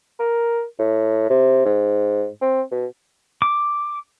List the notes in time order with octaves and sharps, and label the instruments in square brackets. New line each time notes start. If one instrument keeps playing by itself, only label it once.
[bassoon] A#4
A2
C3
G#2
C4
B2
[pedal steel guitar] D6